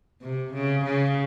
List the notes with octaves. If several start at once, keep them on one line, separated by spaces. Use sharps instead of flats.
C3
C#3
C#3